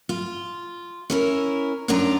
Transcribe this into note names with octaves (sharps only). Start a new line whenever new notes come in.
F4
C#4 E4 A#4
F#2 C#4 D4 F4 A#5